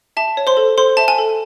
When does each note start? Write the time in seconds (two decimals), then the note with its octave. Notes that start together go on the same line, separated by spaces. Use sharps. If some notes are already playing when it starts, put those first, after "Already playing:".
0.17 E5 A5
0.37 C#5
0.47 C5 C6
0.57 A4
0.78 A4 C5 C6
0.97 E5 A5
1.08 G#5
1.18 A4